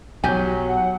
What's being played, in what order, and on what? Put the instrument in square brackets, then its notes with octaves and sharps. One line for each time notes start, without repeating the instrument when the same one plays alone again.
[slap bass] B1 [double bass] F#3 [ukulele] G4 G#5
[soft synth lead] F#5